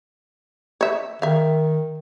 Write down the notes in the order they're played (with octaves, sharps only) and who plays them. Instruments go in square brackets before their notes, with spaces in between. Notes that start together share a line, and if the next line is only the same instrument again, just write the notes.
[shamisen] C#5 E5
[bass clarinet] D#3 [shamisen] E5 F5